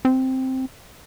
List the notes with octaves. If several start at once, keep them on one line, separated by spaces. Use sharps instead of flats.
C4